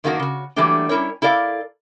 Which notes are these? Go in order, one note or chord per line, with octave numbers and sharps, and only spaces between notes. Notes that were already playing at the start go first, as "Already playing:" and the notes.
F#2 D#3 A#3 D4 F#4 A#4
C#3 F#4
E3 F#3 G3 A3 A#3 D4
G3 C#4 E4 A#4 C#5
E4 A4 A#4 D5 F5